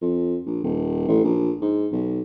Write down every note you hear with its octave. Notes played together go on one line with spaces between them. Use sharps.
F2
A#1
D#1
A1
A#1
G#2
B1